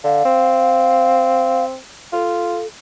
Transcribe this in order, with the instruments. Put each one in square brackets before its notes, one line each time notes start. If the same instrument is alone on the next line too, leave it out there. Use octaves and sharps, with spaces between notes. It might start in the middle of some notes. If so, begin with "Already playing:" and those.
[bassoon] D3 [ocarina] F5
[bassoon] C4
[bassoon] F4 [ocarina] A4